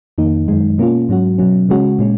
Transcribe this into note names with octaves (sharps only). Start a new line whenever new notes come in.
F2 D#3 A#3 D#4
F#2 D#3 G#3 D#4
B2 A#3 C#4 F4
G#2 F#3 C#4 F#4
B2 F#3 C#4
C#3 G#3 C#4 F#4
A#2 G#3 C#4